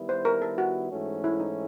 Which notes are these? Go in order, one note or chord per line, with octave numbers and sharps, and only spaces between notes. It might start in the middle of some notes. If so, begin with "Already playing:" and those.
Already playing: D#3 G3 B3 E4
C5
A#4
A4
F#4
G#2 E3 A3 C#4
E4
D#4